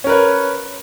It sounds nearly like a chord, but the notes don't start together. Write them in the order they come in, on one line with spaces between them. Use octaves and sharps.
C#4 A#4 B4 C#5